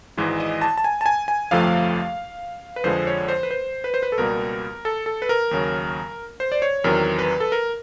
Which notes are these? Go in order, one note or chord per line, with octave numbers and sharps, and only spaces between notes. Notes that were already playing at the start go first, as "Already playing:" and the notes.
G#1 G#2 E3 G#3
D#5
A5
A5
G#5
A5
G#5
G#5
G1 F2 C3 F3 A3 F5
B4
F2 D3 F3 G#3 C5
C#5
C5
B4
C5
B4
C5
B4
A4
C#2 B2 G3 A#3 A#4
A4
A4
B4
A#4
D#2 C#3 F#3
C5
D5
C#5
E2 C3 D#3 F#3 A#4
B4
A4
A#4